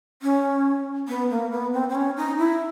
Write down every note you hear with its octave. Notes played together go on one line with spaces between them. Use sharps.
C#4
B3
A#3
B3
C4
C4
C#4
D#4
E4